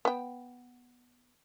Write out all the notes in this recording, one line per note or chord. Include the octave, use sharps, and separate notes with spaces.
B3 G5